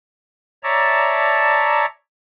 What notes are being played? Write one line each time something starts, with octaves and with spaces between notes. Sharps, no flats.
C#5 D5 E5 A5 A#5